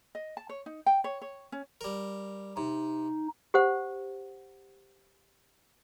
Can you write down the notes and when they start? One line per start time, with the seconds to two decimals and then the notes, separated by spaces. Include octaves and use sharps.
0.15 D#5
0.37 A5
0.49 C#5
0.66 D#4
0.86 G5
1.04 C#5
1.22 C#5
1.52 C#4
1.81 G3 A#4
2.57 C3 D#4
3.54 G4 C5 F#5